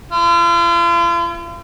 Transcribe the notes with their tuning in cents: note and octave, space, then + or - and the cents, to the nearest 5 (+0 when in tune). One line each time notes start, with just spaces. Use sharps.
F4 -40